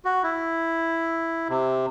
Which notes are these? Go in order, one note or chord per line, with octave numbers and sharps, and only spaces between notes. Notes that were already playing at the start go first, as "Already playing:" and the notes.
F#4
E4
C3